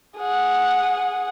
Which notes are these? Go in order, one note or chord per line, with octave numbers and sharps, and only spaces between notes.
G#4 F#5